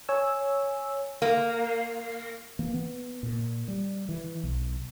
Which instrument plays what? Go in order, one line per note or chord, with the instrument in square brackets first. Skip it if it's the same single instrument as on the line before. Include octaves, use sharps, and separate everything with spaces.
[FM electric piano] C#5 G#5 E6
[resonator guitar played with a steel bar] A#3
[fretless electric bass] E3 A#3
B3
A#2
G3
E3
B1